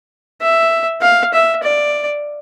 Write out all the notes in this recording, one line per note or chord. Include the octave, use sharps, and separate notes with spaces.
E5
F5
E5
D5